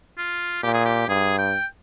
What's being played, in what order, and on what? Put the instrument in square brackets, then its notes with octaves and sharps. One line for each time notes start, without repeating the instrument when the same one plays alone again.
[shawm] F4
[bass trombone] A#2 [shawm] G4
[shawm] G#4
G4
[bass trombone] G2 [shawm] G#4
[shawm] G5